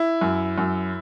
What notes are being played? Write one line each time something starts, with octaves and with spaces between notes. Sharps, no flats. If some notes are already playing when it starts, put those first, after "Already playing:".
Already playing: E4
F#2
F#2